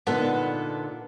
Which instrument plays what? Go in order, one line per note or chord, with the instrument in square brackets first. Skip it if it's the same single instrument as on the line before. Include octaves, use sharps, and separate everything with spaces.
[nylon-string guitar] A#2 D3 D#4 [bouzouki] B3 A4